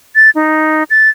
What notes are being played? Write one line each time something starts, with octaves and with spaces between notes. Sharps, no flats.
A6
D#4
A6